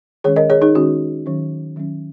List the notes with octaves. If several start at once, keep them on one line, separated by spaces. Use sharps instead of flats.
D#3 G#3 C#4 G#4 C#5
A#4 D#5
G#4 C#5
D#4 G#4
D#3 G#3 C#4 F#4
D#3 F#3 C#4
D#3 F#3 C#4